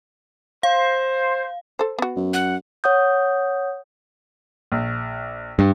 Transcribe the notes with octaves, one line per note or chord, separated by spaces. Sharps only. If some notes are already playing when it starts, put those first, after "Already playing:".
C5 F5
A4 C5
B3 F#4
F#2
F#5
C#5 F#5 D#6 G6
A#1
G2